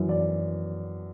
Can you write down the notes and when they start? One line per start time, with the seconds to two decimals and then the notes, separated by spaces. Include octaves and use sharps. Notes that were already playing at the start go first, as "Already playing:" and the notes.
Already playing: F#2 E3
0.09 D5